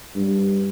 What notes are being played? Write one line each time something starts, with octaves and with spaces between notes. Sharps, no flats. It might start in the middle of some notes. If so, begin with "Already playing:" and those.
G2